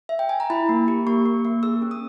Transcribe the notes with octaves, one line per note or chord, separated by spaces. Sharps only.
E5
G5
G#5
A#5
E4 B5
A#3
G4
A#3 C#6
A#3
A#3
G#4 E6
C#4
D#6